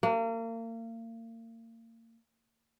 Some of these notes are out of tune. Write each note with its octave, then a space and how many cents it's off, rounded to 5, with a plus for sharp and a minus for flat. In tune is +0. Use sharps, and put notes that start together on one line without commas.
A#3 -35